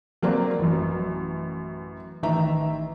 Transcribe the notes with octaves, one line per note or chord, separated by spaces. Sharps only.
F#3 A#3 C4 D5
A1 F#2
A1 D#3 E5 A#5